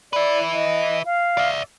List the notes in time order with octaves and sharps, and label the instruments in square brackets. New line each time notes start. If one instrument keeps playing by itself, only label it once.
[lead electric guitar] B4 E5 [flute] D5
[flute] D#5
F5
[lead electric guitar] D5 E5